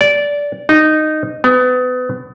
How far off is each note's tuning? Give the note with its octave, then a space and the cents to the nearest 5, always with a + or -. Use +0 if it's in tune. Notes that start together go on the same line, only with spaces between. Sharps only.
D5 -15
D#4 -10
B3 +30